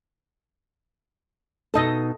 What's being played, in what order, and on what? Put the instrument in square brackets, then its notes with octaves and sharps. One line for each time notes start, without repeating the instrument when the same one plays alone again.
[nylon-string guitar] B2 D#4 A5 [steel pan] A4 D#5